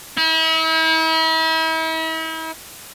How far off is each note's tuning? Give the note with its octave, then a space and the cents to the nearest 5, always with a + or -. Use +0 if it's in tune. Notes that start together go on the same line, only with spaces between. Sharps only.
E4 -40